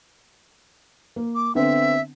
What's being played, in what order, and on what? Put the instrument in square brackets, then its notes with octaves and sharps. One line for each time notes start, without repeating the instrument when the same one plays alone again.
[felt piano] A#3
[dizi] D6
[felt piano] D3 B3 C4 [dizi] E5